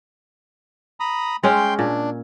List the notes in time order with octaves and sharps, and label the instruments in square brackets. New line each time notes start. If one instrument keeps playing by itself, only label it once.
[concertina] A#5 B5 D#6
[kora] G#3 C#4 [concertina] G5 C6
[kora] A#2 [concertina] D4